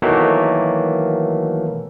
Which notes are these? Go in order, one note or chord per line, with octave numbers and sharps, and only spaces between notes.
B2 D#3 E3 F#3 A3 A#3